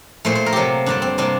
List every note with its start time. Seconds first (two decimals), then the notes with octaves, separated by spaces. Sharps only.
0.25 A#2 A3 C5
0.35 C5
0.46 A#4
0.53 C3 F#3 A#3 G4 A4
0.86 G2 D3 G3 D4
1.02 C4
1.18 C3 G3 A#3 D4